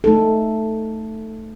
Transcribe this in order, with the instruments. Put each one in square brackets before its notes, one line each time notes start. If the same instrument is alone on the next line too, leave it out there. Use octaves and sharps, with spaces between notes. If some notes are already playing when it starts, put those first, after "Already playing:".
[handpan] A3 D#4 A4